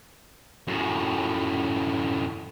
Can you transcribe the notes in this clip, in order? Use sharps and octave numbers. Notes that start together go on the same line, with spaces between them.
F#2 A2